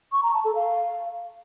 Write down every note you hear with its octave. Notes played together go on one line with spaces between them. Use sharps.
C#6
A#5
A5
A4
F5